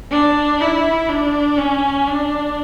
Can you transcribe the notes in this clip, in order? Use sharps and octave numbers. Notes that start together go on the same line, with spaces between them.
D4
E4
D4
C#4
D4